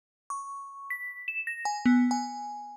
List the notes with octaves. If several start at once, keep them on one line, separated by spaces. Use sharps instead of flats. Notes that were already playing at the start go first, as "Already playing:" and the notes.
C#6
B6
E7
A#6
G#5
B3
G#5